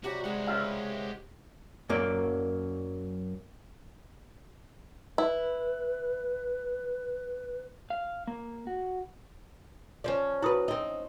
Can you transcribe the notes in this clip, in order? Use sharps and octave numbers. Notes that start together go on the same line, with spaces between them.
C3 F#3 G3 F#4 G4
G#3 E4 G4 F#5
C#2 F#4 E5 F5
F#2 F#3 A#3 D5
E4 B4
F5
A#3
F#4
F3 C#4 C5 D5
E4 F#4 B4 D#6
C4 D#4